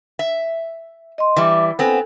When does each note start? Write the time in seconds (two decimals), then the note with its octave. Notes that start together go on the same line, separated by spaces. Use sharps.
0.19 E5
1.18 D#5 C6
1.36 E3 G3 E5 D6
1.79 B3 C4 A4 G#5